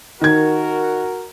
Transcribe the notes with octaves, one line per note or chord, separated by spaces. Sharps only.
D#3 F#4 A#4 G#6